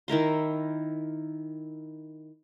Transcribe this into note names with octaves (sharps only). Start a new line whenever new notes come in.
D#3 E4 A#4 C6